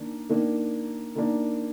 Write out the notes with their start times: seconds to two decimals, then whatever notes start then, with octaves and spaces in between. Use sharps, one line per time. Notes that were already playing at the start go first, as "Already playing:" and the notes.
Already playing: D#3 A#3 D4
0.29 D#3 A#3 D4
1.15 D#3 A#3 D4